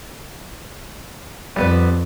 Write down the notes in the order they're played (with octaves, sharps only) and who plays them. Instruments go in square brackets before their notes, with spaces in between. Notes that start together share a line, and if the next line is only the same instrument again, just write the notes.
[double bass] F2 [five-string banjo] G3 B3 B4